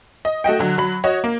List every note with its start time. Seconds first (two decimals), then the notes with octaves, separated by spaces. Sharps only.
0.25 D#5
0.44 A3 F#4 D#5 G5
0.59 D3 F#3
0.78 F#3 B5
1.04 F#4 C#5 D#5
1.24 A#3